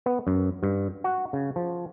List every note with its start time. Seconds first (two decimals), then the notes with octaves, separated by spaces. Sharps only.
0.06 B3
0.27 F#2
0.63 G2
1.04 F#4
1.33 C#3
1.56 F3